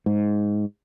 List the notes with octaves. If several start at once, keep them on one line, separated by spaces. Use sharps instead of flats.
G#2